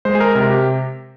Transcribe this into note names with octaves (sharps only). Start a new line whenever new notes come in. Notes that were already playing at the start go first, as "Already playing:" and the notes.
G#3 C5
G#4
A#4
C3 A#4
G4